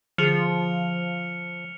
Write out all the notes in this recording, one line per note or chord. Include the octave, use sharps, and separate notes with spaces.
D3 F3 G#4 F6 C#7 F7